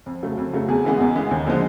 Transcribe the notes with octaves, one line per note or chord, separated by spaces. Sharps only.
F2
C#3 F#3 A3
F2
C#3 F#3 A3
E2 G#4
C#3 E3 G#3 B3
E2
C#3 E3 G#3 B3
D#2
D3 F3 G#3